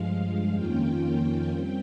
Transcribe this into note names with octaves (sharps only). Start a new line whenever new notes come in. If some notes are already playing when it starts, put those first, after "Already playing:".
Already playing: G2 F3 G#3 F5
F2 D#3 A#3 C#4 F4 G5
G3 C4 G5